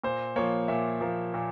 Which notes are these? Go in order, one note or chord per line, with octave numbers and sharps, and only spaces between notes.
A#2 C5
F3 A#3 C#5
A#2 E5
F3 A#3
A#2